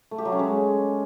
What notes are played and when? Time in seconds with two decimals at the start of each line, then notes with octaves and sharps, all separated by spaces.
0.11 A3
0.18 G4
0.25 F#3
0.32 C#4
0.39 G#3